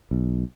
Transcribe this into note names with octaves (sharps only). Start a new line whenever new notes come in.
B1